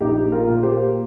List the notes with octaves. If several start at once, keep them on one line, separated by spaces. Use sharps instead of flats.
A#1 D#4 G4
F4 A#4
A#2 A#3
G4 C5